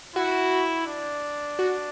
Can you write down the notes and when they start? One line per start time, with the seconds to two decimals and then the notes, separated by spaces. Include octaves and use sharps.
0.16 E4 F#4
0.87 D4
1.59 F#4